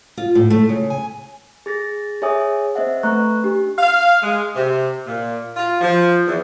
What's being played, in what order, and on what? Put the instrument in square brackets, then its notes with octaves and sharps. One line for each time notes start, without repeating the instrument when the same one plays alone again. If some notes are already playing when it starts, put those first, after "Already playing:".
[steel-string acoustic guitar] F4
A2
A3
C#3
G#5
[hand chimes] G#4 A6 A#6
G#4 C#5 E5 G#5 D#6
C4 C5 D#5 E5 F#5
A3 B4 A#5 C#6 F#6
D4 G4
[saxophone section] F5
G#3
C3
A#2
F4
F3
E2